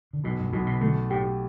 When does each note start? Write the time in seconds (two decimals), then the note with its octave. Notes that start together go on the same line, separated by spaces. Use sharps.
0.13 D3
0.24 B1 B2
0.39 G2
0.53 B1 B2
0.66 B2
0.81 D3 A3
1.10 A2 G4